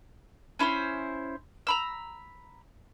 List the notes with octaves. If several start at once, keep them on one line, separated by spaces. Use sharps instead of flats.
C#4 E4 A4 C5
A#5 B5 E6